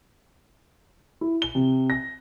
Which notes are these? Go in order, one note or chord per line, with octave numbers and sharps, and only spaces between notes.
E4
G7
C3
A#6